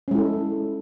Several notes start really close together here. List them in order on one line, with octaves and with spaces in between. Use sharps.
C#4 G#3 E4 A4